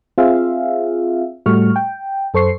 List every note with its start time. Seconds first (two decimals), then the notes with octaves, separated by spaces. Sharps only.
0.18 C4 F4 G#4 E5 F5
1.46 A2 G3 A3 F#4 C#6 F6
1.76 G5
2.34 F#2 A4 C5 C#6 C7